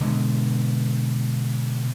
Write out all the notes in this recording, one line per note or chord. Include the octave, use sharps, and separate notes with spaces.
B2 D3 G#3